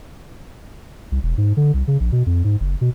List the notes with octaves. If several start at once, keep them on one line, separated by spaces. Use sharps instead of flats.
C2
E1
G#2
D3
C2
C#3
A#1
B2
F2
G#2
F#1
B2